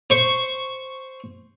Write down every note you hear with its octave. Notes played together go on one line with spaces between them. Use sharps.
C5 C#6